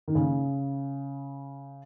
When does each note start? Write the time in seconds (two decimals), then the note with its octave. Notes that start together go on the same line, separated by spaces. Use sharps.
0.08 D#3
0.15 C#3